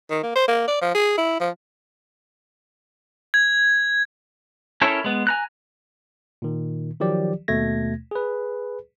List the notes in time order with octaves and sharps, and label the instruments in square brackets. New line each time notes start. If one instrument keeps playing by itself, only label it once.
[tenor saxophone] D#3
A#3
C5
A#3
D5
F3
G#4
E4
F3
[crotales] G#6
[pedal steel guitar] C#4 E4 A4 A#4 C#5
G#3 B3
G#5 A#5 F#6
[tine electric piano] A#2 D#3
D#3 F3 F#3 G4 D5
D#2 B2 A3 G#6 A#6
G#4 B4